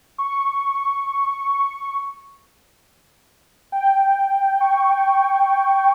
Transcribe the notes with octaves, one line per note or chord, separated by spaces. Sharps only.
C#6
G5
C#6